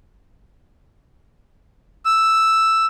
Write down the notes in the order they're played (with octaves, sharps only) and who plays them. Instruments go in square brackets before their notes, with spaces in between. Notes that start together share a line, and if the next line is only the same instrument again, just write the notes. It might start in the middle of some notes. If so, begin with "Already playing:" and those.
[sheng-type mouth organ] E6